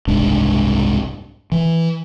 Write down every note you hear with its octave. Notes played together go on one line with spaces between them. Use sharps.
F#1 C2 G#2 D4
E3